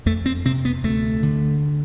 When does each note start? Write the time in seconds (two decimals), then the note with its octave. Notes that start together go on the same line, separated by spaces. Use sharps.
0.06 F2 A3
0.26 C4
0.45 C3 C4
0.65 B3
0.84 D2 A3
1.23 D3